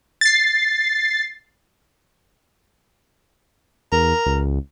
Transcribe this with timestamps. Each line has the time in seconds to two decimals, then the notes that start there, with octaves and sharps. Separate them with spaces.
0.21 A6 C7
3.92 E2 A#4
4.26 C#2